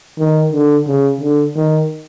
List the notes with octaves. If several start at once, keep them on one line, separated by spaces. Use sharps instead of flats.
D#3
D3
C#3
D3
D#3